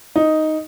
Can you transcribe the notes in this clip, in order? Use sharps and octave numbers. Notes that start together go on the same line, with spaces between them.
D#4